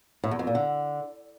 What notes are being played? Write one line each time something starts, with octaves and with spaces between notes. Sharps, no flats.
A2
E2
F2
A#2
D3